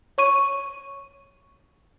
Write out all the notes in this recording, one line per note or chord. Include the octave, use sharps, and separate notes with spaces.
C#5 C#6 D#7